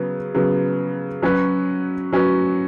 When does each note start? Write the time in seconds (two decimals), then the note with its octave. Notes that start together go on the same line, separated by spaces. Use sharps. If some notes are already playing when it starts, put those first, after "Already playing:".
Already playing: C#3 F#3 B3
0.35 C#3 F#3 B3
1.22 F#3 C#4 F#4 B4
2.12 F#3 C#4 F#4 B4